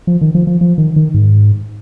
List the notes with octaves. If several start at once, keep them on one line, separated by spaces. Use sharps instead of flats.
F3
D#3
F3
F3
F3
D#3
D#3
G#2